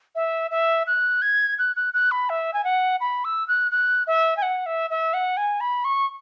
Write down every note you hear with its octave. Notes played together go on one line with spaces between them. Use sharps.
E5
E5
F#6
G#6
F#6
F#6
F#6
B5
E5
G#5
F#5
B5
E6
F#6
F#6
E5
G#5
F#5
E5
E5
F#5
G#5
B5
C#6